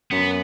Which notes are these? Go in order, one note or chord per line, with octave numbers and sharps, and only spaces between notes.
F#2 B3